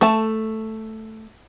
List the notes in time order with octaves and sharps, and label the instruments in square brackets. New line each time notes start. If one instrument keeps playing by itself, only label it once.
[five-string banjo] A3 A5